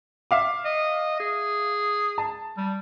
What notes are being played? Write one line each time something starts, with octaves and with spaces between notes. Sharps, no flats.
E5 F5 D6
D#5
G#4
A5
G3